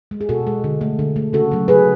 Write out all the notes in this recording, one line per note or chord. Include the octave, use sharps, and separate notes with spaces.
G#3
G#4
B2 F#4 A4
G#3
D3
A3
D3
A3
C#3 F#4 A4
F#3 A3
C#3 G#4 B4